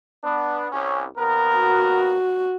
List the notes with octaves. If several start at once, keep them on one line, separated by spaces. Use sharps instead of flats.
B3 D4
C2 C#4
D#2 B3 A#4
F#4